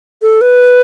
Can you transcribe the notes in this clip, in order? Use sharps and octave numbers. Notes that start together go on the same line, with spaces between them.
A4
B4